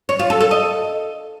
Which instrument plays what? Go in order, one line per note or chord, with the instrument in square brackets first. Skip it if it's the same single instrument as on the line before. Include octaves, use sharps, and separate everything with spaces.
[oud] C#5
F4
A4
A4
D#5